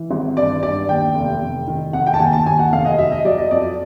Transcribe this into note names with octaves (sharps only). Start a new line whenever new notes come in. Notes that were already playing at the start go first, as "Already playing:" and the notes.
Already playing: E3
G#1
G2 D5
G2 D5
D#2 G5
F1
F1
D#3
F1 F#5
G5
A5
D#2 G#5
A5
D#2 G#5
F#5
F1 F5
D#5
F#3 E5
D#5
F#3 D5
D#5
F2 D5